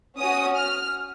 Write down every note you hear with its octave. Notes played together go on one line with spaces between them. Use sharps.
C#4 F#4 D#6
F6